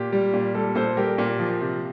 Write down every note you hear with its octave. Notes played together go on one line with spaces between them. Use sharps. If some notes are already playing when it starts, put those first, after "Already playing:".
Already playing: A#2 G4
G3
A#2
G3 A4
A#2 A4 C5
G3 G4 A#4
A#2
F3
C3